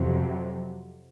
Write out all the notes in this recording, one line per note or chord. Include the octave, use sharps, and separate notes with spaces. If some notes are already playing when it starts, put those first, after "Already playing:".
Already playing: F2 C3 F#3